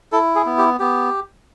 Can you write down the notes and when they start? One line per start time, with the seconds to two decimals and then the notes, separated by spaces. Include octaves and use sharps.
0.12 E4 A4
0.35 G#4
0.46 B3
0.58 G4
0.79 B3 G4